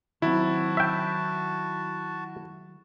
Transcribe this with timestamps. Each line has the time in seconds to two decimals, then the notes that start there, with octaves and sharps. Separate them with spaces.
0.22 D#3 F#3 C4 E4 F#4 A5
0.77 E5 G5